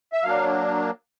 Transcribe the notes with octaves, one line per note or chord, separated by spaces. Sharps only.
E5
F#3 A#3 D4 F5